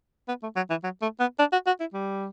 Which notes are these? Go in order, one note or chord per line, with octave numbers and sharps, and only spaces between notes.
B3
A3
F#3
E3
F#3
A3
B3
D4
F#4
F#4
E4
G3